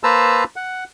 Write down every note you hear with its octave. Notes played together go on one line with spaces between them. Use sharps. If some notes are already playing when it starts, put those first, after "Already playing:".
A#3 B4 C5 A5 A#5 E6
F#5